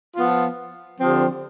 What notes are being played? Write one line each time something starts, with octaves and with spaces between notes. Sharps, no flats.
F3 B3 F4
D3 F3 C4 G4